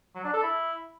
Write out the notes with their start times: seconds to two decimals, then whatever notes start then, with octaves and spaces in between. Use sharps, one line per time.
0.15 F#3
0.24 D4
0.34 A4
0.43 E4